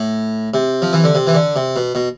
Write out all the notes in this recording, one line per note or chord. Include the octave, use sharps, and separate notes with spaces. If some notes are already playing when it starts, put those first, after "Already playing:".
Already playing: A2
C3
F3
E3
D3
C3
E3
D3
C3
B2
B2